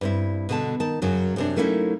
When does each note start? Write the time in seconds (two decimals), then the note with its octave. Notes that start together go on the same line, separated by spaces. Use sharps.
0.01 G2 C4 E4
0.49 B2 D3 A5
0.80 D#3 A5
1.02 F#2 C#3 F#3
1.36 F#2 C3 D4
1.56 F#3 A3 A#3 C#4 D#4 E4